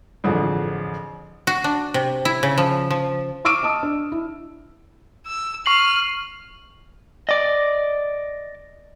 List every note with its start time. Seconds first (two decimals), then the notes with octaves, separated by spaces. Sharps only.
0.24 A1 F2 D3 G#4
1.47 F#4
1.64 D4
1.94 C3
2.25 E4
2.43 C#3
2.58 F3
2.91 F3
3.45 C#6 D6 E6 F6 D7 D#7
3.63 D#5 A5 D#6
3.83 D4
4.12 E4
5.26 E6
5.66 C#6 F6 C7 F#7
7.29 D5 D#5